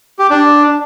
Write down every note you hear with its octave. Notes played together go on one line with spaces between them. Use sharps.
G4
D4